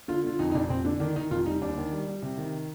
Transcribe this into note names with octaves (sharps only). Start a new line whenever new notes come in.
D3 F4
D3 F4
F2 D#4
D#4
F1 D4
F1 C4
D3 D4
D#3 D4
D#3 D#4
F1 F4
G3 D#4
D#2 D4
D#3
G3
G3
C3
D#3